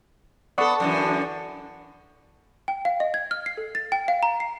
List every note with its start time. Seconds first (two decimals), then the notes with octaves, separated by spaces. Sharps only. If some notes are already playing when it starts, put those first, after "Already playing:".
0.58 B3 A4 D5 F#5 C#6
0.80 F#2 D3 E3
2.68 G5
2.85 F5
3.00 D#5
3.14 G#6
3.31 F6
3.46 C7
3.57 A4
3.75 A6
3.92 G5
4.08 F5
4.23 A#5
4.40 C7